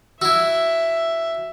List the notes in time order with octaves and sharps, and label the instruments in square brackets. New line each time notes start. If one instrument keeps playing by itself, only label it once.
[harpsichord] E4 F#4 [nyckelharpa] E5 [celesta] E6